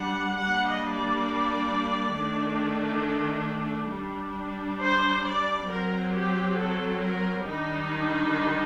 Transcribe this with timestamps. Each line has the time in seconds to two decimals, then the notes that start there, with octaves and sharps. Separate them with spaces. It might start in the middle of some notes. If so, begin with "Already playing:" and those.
Already playing: G3 D4 F#5
0.37 G3 A#3 D4 F#5
0.68 D#5
0.97 D5
2.15 D#3 A3 D4
3.92 G3 D4
4.81 C5
5.26 D5
5.69 F#3 C4 A#4
6.14 G4
6.59 A4
7.03 A#4
7.47 D#3 G3 D4 D#4